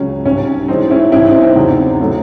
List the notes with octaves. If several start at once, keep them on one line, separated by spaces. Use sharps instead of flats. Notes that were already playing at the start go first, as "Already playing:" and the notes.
Already playing: C#2 C#3 F#3 C#4
C2 C3 D#3 C#4
F#2 E3 G#3 C4 D#4
C#4 E4
C2 C3 E3 C#4 E4
C4 D#4
C4 D#4
E2 C#3 F#3
A2 F#3 A3